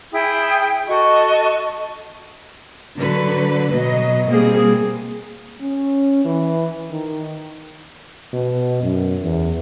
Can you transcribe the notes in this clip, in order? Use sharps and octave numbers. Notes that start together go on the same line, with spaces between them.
E4 G#4 G5 D#6
F#4 A4 D#5 C#6
D3 F#3 B4
B2 F#3 D#5
B2 G3 A#3 C4 G#4
C#4
E3
D#3
B2
F#2
E2